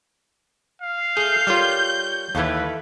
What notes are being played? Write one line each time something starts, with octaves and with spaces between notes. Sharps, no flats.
F5
A3 G#4 G6
G3 F4 A#4 C#5 F6
D#2 E3 E4 A4 B4 F5